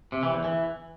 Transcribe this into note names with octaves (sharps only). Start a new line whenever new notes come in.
C3
E3
E2
E3